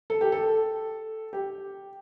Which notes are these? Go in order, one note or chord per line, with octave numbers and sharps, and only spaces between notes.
A4
G4
A4
G4